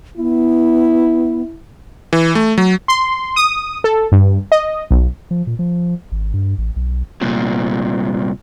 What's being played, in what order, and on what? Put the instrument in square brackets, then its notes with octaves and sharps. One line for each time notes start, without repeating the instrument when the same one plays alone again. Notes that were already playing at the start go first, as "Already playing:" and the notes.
[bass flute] B3 [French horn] E4
[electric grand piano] E3
A3
F#3
[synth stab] C6
D#6
A4
G2
D#5
B1
[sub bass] F3
A#2
F3
G#1
G2
A1
B1
[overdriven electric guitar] C2 A#2